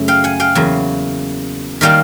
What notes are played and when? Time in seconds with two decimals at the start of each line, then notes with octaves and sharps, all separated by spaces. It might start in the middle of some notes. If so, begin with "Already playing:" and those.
Already playing: F#2 C#3 F#3 A3
0.08 F5 G5
0.24 F#5 G#5
0.40 F5 G5
0.55 E2 C#3 F#3 A#3
1.81 D#3 G3 A#3 F5 G5